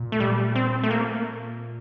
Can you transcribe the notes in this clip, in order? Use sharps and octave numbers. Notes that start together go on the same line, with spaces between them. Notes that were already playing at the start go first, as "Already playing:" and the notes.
Already playing: A#2
A3
G3
C4
A3
A#3